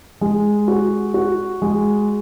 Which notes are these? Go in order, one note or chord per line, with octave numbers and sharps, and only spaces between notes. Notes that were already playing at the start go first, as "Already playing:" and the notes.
G#3
F#4
F#4
G#3